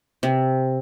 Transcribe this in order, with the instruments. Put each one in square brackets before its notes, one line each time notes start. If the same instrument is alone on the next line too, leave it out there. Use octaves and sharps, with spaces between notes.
[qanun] C3